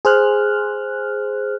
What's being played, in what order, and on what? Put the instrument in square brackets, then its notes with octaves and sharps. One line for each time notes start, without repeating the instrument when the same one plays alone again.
[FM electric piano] G#4 C5 F6 F#6